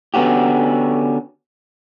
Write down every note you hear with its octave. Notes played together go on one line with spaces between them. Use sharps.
D3 B3 C#4 F#4 G4